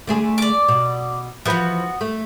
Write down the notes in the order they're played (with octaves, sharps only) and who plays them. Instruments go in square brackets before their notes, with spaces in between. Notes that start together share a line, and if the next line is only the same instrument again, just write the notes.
[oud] D3 A3 G#4
[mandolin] D5 D6
[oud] B2
[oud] E3 F3 B4 [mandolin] B3 F#4
[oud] A3